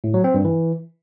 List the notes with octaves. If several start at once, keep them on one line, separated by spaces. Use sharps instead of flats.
A2
F#3
C4
G2
E3